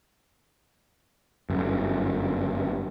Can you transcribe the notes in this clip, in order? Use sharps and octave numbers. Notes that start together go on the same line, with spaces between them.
G1 F#2